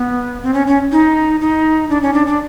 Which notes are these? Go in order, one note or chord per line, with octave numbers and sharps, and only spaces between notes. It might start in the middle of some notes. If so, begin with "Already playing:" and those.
Already playing: B3
C4
C#4
C#4
D#4
D#4
D4
C#4
D4
D4